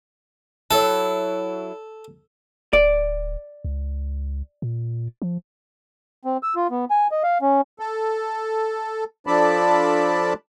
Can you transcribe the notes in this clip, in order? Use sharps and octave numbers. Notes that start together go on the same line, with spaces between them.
F#3 E4 A4
D1 D5
C#2
A#2
F3
C4
E6
F4
B3
G#5
D#5
F5
C#4
A4
F3 D4 A4 D5 A5 B5